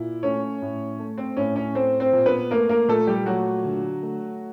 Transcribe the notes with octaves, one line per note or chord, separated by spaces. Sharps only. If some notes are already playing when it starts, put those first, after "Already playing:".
Already playing: A#2 E4
A3 C#4 C#5
A2
A3
C4 C5
A2 C#4 C#5
C#4 C#5
A3 C4 C5
C4 C5
A#2
B3 B4
A3 A#3 A#4
A#3 A#4
A#2 A3 A4
G3 G4
F#3 A3 F#4
D3
A3